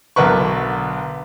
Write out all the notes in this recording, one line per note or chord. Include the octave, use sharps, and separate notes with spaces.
B1 D3 A#4 B4 C#6